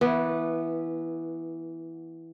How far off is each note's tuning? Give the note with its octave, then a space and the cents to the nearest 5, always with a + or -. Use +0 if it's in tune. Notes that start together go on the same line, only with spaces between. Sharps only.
E3 +0 B3 -15